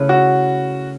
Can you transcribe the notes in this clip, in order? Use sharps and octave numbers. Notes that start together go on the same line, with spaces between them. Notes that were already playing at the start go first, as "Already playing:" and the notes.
Already playing: C#3 A3 E4 B4
F#4